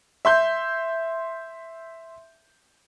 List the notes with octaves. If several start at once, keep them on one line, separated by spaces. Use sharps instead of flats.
E5 C6 G6